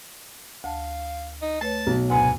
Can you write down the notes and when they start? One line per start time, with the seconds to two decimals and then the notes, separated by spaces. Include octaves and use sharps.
0.64 D2 F5 A5
1.42 D#4
1.61 A3 B4 C#5 A5
1.87 B1
2.10 D2 G#2 C3 B3 G#5